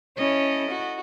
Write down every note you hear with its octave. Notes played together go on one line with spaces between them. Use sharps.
C#4 E4 A4 D#5
F#4